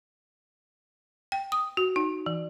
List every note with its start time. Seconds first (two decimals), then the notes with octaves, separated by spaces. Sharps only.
1.32 G5
1.52 D#6
1.77 F#4
1.96 D#4
2.26 E3